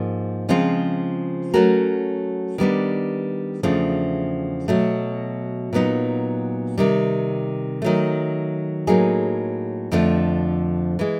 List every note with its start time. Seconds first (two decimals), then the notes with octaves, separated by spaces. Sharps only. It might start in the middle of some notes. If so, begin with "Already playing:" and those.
Already playing: G#2 F3 A#3
0.49 C#3 F3 G#3 C4 F4
1.54 F#3 A3 C#4 F#4 A#4
2.58 D#3 G3 B3 D4
3.63 E2 C#3 F3 A3 D4
4.68 B2 F#3 A3
5.73 A#2 F#3 B3 D#4
6.78 C3 D#3 G3
7.82 D#3 F#3 A3
8.87 A2 F#3 A#3 D#4 G#4
9.92 F2 D3 F3 A3 D4
10.99 E3 G#3